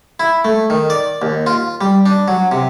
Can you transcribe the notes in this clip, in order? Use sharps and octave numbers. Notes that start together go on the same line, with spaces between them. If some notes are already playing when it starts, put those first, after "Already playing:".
E4
A3
D#3
D5
D#2
F4
G3
D4
F#3
C3